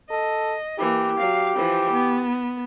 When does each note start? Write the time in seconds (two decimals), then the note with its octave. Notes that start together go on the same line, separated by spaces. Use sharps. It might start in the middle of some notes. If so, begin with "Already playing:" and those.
0.10 A4 D#5
0.79 E3 A#3 G4
1.18 F#3 F5
1.56 E3 F3
1.92 B3